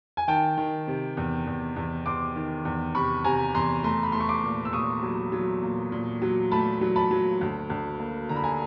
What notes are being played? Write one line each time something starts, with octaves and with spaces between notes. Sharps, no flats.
G#5
D#3 G5 A5
D#3
C3
E2
E2
E2
E2 C6 D6
D#3
E2
C3 B5 C#6
C3 G#5 A#5
E2 A#5 C6
A3 A#5 C6
B5
A3 C6
C#6
C6 D6
A#2
E6
A#2 C#6 D#6
F#3
F#3
A#2
A#2
F#3
A3 A5 B5
F#3
A5 B5
F#3
D2
D2
A#3
D3 A#5
B5
G#5 A#5